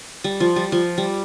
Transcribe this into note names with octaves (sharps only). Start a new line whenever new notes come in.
G3
F3
G3
F3
G3